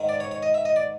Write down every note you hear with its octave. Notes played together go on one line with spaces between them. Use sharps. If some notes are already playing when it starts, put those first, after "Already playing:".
Already playing: G#2 D#3 G#3
D5
C#5
C#5
D#5
E5
D#5
D5